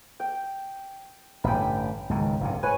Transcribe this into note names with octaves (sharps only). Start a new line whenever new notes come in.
G5
A1 G2 D3 G5 B5
C#2 G#2 D#3
F1 G2 C3
G#2 B4 C#5 G#5